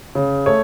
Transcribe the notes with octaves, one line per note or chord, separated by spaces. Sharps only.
C#3
A3 C#5